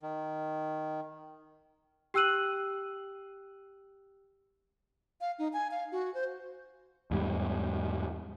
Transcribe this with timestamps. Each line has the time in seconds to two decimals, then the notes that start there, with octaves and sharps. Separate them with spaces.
0.02 D#3
2.14 G4 G5 E6 F#6 D#7 F#7
5.21 F5
5.39 D#4
5.53 G#5
5.71 F5
5.92 F#4
6.14 C5
7.11 E2 G#2 G3